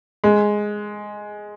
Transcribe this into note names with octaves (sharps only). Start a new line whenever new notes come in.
G#3